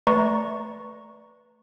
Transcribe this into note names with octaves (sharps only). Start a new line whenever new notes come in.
A3 B4 D5 A#5 C#6